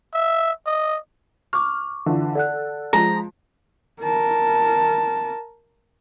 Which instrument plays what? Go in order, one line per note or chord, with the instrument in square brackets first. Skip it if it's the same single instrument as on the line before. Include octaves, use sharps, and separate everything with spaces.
[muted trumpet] E5
D#5
[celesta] C#6 D6 [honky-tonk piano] F6
[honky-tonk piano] D3 E3 F4
[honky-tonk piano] A4 [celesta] D5 F#5 F#6
[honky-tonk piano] F3 G#3 [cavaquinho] A#5
[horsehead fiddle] A#4 A5